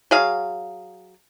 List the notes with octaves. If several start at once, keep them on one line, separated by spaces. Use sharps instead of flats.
F#3 G#4 F5